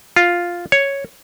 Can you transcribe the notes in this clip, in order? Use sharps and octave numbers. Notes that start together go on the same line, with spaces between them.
F4
C#5